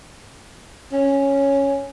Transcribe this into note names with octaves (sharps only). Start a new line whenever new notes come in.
C#4